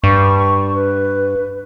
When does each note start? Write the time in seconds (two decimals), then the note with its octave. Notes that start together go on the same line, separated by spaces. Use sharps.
0.04 G2 C#6
0.74 B4